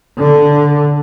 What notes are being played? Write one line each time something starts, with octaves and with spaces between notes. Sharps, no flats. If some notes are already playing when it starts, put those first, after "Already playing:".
D3